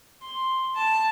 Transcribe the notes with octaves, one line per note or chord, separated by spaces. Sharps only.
C6
A5